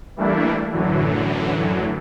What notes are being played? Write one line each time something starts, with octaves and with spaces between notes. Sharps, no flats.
E3 G3 A3 A#3 D4 E4
F#2 A2 D3 E3 F#3